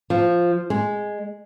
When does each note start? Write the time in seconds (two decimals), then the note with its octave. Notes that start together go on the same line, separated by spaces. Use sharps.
0.10 F3
0.70 G#3